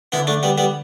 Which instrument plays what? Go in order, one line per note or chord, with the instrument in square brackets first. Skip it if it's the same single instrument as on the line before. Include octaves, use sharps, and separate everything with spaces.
[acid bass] D3 [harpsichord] B3 E4
[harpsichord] A3 D4
G3 B3
G3 B3